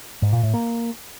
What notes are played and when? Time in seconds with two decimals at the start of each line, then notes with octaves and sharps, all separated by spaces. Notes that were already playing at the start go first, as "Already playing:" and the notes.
0.22 G#2
0.33 A#2
0.43 A2
0.54 A#3